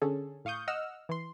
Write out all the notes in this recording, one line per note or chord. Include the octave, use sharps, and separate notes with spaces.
D3 C#4 G#4 A4
A2 F5 C#6 D#6 G6
D#5 F#5 E6 F6
E3 C6